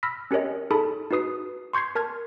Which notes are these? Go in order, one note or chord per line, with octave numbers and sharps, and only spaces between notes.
B5 E6 F6 A#6 B6
C#4 G4 A#4 C#5 D#5
D#4 G#4 A4 A5 B5
D#4 F#4 B4 D#6 C7
C6 C#6 G6 G#6 C7
A#4 A5 F6 G#6